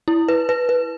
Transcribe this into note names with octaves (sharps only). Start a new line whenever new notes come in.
E4
B4
B4
B4